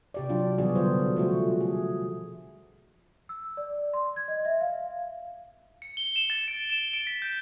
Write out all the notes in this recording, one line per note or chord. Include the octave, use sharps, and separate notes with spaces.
C3 G4 D5
F#3 D4 F4
B2 E3 F#3 G3 F#4 G#4
D3 F#3 F4 C5
F3 A3 F#4
G#4
E6
D5
C6
G#6
D#5
E5
F5
C#7
G7
E7
A6
D7
E7
D7
B6
G6